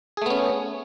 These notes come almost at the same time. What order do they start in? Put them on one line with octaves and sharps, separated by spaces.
G#4 A3 B3 C#4